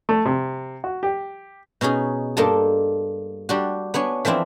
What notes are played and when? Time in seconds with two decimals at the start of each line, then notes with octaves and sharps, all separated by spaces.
0.09 A3
0.25 C3
0.84 F#4
1.03 G4
1.81 B2 C#4 D#4 G#4
2.37 G2 A#3 D4 A4 D#5 A5
3.49 G3 D4 F#4
3.94 B3 D4 C#5 G#5
4.25 E3 F3 C4 D4 E4